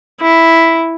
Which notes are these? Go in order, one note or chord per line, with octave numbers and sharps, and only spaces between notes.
E4